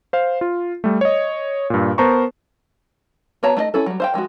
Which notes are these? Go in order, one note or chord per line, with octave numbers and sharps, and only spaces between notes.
C5 F5
F4
G3 A3
C#5 D#5
G2 A#2
B3 A#4 C5 A5 A#5 C#6
B3 F#4 C#5 A5 A#5
A3 D4 D#4 D#5
C#4 E4 A4
F#3 G3
C5 F5 G5
F3 G#3 D4 F#4